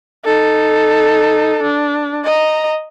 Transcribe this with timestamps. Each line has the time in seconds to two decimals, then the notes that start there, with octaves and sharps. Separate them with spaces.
0.25 D#4 A4
1.63 D4
2.24 D#5 A#5